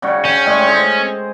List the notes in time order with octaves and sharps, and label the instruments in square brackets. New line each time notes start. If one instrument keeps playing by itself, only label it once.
[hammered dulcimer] C#3 G3 F#4
[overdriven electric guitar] C#4 [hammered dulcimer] G5
[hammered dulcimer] A2 G3 G#3
G#4 C5 D#5